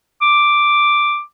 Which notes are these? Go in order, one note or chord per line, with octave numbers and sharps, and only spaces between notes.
D6